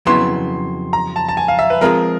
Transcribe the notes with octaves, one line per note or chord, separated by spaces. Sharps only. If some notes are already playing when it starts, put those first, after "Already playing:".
F2 C#3 F#3 B3 E4 C6
A#5
A5
A5
G#5
F5
E5
B4
F3 G#3 C4 F4 G#4 A#4